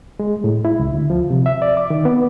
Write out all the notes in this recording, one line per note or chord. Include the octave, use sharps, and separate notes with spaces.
G#3
A2
E4
C#2
D2
F3
C3
E5
D5
D6
D#3
B3